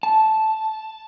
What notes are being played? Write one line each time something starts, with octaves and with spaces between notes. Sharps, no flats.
A5